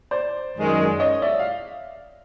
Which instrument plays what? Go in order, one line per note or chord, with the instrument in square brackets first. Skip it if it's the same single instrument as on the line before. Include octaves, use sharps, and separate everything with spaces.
[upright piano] C5 D5
[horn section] F#2 D#3 G#3
[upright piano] C#5 D#5
D5 E5
F5